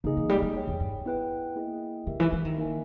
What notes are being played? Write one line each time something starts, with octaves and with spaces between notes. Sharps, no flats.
C#3 A#3 D#4 G#4 D#5
E3
G3
G3
G#4 C#5 G5
E2
G2
B3 E4 G#4 B4 G5
A#3 E4 G#4 D#5 G5
C#3 G4 A#4 E5
E3
E3
D#3
A#3 D#4 A#4 E5 G#5